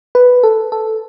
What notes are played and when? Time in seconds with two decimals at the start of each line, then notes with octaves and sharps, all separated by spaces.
0.15 B4
0.44 A4
0.72 A4